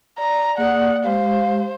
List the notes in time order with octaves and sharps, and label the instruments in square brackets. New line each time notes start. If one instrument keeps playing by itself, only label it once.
[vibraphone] D5 [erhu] A#5
[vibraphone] A#3 D5 D#6 [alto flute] G#4 [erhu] F#5
[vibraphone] G#3 G4 [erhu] C5 [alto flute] F5